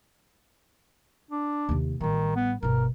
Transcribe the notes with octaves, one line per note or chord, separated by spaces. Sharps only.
D4
D#2 C3
A1 D#3 G3
B3
G1 B2 A#4